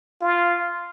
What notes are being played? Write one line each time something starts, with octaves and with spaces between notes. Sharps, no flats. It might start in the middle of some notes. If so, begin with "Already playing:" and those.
F4